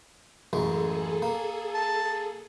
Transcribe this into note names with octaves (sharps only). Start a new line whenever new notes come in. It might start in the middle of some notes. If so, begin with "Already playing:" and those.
A1 F#2 G#3 G#4 A4
A#3
A5